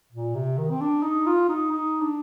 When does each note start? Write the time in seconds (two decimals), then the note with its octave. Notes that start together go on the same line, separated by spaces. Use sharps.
0.12 A#2
0.35 C3
0.58 D#3
0.71 C4
0.81 D4
1.03 D#4
1.26 F4
1.49 D#4
1.71 D#4
2.01 D4